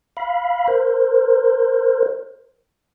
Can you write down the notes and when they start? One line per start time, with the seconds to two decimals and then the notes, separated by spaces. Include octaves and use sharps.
0.17 F5 B5
0.68 A#4 C5